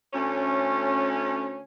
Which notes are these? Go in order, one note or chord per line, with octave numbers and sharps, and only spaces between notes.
D2 A3 C#4